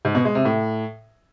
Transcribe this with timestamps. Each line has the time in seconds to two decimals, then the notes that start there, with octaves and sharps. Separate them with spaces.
0.05 G#2
0.15 B2
0.25 G#3
0.35 C3
0.45 A2